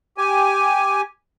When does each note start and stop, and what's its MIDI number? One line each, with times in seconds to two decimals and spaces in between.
0.18 1.02 67
0.18 1.02 80